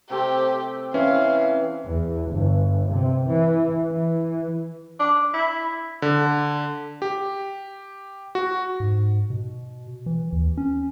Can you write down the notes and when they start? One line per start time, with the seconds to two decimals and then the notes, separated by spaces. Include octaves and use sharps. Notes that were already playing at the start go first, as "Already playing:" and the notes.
0.10 C3 A3 C4 G4
0.94 E3 C#4 F5
1.86 E2
2.32 G1
2.92 C3
3.26 E3
3.91 E3
4.99 D4
5.33 E4
6.02 D3
7.02 G4
8.35 F#4
8.80 G#2
9.30 B2
10.06 E3
10.33 D#2
10.57 C#4